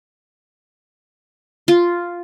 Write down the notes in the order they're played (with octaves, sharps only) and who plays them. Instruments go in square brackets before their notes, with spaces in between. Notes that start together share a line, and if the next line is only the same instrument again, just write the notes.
[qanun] F4